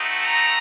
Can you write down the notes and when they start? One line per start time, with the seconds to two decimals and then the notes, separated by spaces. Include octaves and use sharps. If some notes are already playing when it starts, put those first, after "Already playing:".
Already playing: A3 C4 D#4 F#4
0.25 A#5